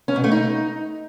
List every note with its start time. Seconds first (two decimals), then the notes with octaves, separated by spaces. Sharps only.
0.08 C#4
0.16 B2
0.24 A3
0.32 D#4